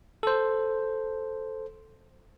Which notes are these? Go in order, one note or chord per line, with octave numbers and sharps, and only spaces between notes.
A4 C5